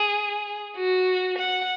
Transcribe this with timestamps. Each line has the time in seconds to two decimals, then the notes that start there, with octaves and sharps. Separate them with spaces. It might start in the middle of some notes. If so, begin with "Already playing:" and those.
Already playing: G#4
0.77 F#4
1.38 F#5